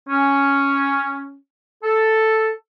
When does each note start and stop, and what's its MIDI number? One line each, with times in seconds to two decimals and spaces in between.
0.09 1.36 61
1.83 2.50 69